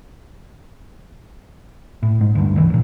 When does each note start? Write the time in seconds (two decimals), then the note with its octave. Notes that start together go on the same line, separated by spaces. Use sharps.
2.03 A2
2.21 G#2
2.35 D2 G2
2.55 C2 D3 E3
2.70 C#2 A#2